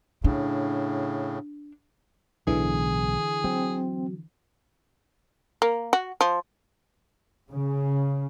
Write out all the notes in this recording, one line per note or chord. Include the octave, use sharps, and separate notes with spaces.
A2 C#3 D4
B1 A2 D3 E3 G#4
F#3 C4
A#3
F#4
F3
C#3